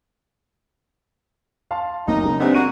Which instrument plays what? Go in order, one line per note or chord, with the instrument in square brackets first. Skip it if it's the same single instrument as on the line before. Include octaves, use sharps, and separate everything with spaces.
[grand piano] F5 A5 C6
[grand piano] F#1 A#3 D#5 [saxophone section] D#4
[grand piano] C#3 D#5
[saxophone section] G#3 A3 B3 [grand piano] C4 D4 G4
[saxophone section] A#3 F#4 [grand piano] D#7